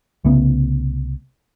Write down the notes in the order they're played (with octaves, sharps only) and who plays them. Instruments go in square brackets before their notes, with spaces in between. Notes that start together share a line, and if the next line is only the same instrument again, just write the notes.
[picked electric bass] C2 C#3 A3 B3